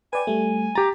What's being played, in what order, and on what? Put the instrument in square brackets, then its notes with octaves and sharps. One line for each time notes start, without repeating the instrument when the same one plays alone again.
[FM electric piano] B4 D5 G5 [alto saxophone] G#5
[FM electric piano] G3 A3
[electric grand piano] G4 A#5 [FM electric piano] A6